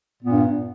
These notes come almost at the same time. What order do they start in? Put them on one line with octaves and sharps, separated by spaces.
A#2 B3 G2